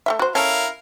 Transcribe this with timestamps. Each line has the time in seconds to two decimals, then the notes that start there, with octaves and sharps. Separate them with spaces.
0.06 A3 A#3 E5
0.19 F#4 C5
0.35 C#4 E4 A4 A#4 F5